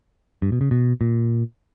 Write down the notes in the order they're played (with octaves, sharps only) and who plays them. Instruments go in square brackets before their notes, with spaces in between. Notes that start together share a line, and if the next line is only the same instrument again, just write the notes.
[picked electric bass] G2
B2
C#3
B2
A#2